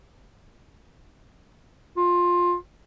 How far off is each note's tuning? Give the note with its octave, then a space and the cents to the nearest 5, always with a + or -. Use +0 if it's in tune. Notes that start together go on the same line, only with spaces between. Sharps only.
F4 +15